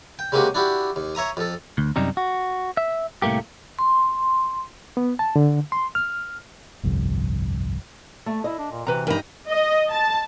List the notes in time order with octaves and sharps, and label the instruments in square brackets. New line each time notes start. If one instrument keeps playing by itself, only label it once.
[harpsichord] G5
C#3 G#3 A#3 C4 F#4 G4
D4 E4 F#4 G4
D#2
C#5 E5 A#5 D#6
F2 A4
[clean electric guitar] D2
F#2 C3 G3 D#4
F#4
E5
C2 A2 A3 A#3 G4
[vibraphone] C6
[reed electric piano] B3
A5
D3
C6
F6
[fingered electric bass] G1 C2 F2
[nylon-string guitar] A3
[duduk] E4 [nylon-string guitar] D#5
[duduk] D4
A#2
[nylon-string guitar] C3 [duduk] E3 [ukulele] F#4 B4 A#5
[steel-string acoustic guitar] G2 D#4 [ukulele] A#4 G#5 B5
[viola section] D#5
A5